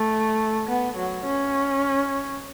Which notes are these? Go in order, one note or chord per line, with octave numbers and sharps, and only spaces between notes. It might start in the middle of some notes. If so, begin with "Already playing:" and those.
Already playing: A3
B3
F#3
C#4